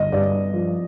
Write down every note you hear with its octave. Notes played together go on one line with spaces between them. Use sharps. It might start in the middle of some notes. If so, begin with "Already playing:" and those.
Already playing: G1 D#5
G2 D5
F3